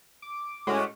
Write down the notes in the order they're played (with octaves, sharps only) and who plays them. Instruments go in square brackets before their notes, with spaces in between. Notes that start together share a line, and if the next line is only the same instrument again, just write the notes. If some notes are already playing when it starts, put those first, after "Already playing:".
[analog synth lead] D6
[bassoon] A2 [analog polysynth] G#3 [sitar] A3 C#4 F#4